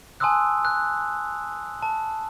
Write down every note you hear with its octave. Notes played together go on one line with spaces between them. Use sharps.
G#5 A5 C6 D#6 E6 F#6
F#6
A5